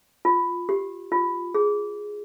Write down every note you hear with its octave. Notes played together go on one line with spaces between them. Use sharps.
F4
G4
F4
G#4